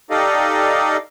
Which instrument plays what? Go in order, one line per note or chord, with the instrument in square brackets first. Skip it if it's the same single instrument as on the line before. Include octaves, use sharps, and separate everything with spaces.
[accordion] D#4 G4 A4 D5 D#5 F5